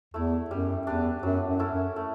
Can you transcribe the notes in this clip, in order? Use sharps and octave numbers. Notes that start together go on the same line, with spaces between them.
E2 A3 E4
F#2 G3
E2 D4 G4 B4
F#2 F#3
F#2
C#4 E4 A4
F#2
A3